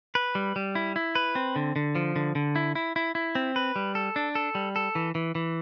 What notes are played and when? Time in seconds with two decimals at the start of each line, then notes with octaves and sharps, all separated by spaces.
0.15 B4
0.35 G3
0.56 G3
0.75 E4
0.96 E4
1.15 B4
1.35 C4
1.56 D3
1.76 D3
1.95 F3
2.16 D3
2.35 D3
2.56 E4
2.75 E4
2.96 E4
3.15 E4
3.35 C4
3.56 B4
3.76 G3
3.95 A4
4.16 D4
4.35 A4
4.55 G3
4.76 A4
4.95 E3
5.15 E3
5.35 E3